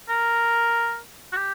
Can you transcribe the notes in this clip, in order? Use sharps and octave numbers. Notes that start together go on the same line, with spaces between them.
A#4
F#4
G4